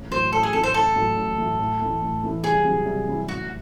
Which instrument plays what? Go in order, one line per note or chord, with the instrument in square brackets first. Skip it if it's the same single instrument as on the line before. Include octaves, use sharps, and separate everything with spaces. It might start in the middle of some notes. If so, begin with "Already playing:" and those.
Already playing: [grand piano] A1
[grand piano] A2 F#3 C#4 E4 [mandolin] C5
[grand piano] A1 [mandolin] A4
[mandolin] G#4
[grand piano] A2 F#3 C#4 E4 [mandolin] A4
[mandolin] C5
[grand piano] A1 [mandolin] A4
[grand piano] A2 F#3 A3
A1
A2 F#3 A3
A2
E3 A3 C#4 E4
A2
E3 A3 C#4 E4
[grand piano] C2 [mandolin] G#4
[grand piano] C3 F#3 C#4 E4
C2
C3 F#3 C#4 E4
[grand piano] A1 [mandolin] F#4